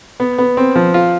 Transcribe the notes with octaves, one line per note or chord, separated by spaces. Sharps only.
B3
B3
C4
F3
F4